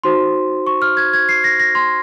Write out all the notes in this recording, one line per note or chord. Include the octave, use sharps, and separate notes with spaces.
D#4 F#4 C5 C6
C#6
F6
G#6
G#6
C7
A#6
A#6
C6